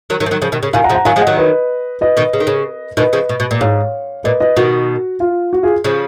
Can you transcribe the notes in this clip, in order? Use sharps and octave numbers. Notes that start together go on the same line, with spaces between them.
D#3 F#3
D#3 F#3
F3
D#3 F#3
C#3 F3
B2 D#3
C#3
B2 D#3 F5 G#5
F#5 A#5
C#3 F3
F#5 A#5
D#3 F#3 F5 G#5
F3 G#3
D#5 F#5
D#3 F#3
B4 D#5
B4 D#5
B2 D#3
C#3
D#3
C#3
B2 D#3 B4 D#5
C#3 F3
B2
B2
A#2
G#2 C#5 F5
A#2 B4 D#5
B4 D#5
B2 D#3 F#4
F4
F#4
F4 G#4
C#3 F3